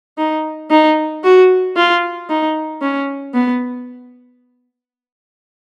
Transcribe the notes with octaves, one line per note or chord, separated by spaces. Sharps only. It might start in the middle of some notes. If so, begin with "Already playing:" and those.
D#4
D#4
F#4
F4
D#4
C#4
B3